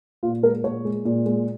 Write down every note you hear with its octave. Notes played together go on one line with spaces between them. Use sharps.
A#2 F4
G#3 A#4
A#2 C#5
G#3
A#2
G#3